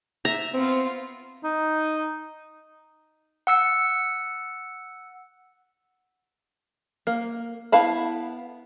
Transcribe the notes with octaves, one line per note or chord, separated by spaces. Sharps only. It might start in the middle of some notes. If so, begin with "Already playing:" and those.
E5 A#5
B3 C4 F4
D#4
F#5 E6 C#7
A#3
B3 E4 F5 A5 B5